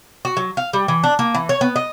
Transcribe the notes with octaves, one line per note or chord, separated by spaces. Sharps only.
F#4
F#3
F5
G3
E3
D4
A#3
E3
C#5
B3
D#5